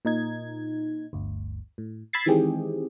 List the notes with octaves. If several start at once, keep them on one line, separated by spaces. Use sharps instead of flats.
A#2 D#4 G#6
G1 D2
A2
B5 E6 G#6 A6 C7
D#3 E3 G#3 C4 G4 G#4